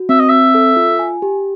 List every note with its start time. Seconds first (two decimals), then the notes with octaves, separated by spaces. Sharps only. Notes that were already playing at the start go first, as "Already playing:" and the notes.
Already playing: F#4
0.09 C4 E5
0.19 D#5
0.29 C4 E5
0.55 A4
0.77 F4
0.99 G#5
1.22 G4